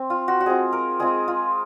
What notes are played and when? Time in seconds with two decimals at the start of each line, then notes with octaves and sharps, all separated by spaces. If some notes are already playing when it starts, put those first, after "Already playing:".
Already playing: C4
0.10 F4
0.28 F#4
0.40 F#4
0.46 G#3 C4 F4 G#4
0.73 A#4
1.00 G#3 C4 F4 G#4
1.28 F4